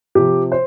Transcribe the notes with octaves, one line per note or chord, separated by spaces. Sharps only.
C3 F3 G4
C5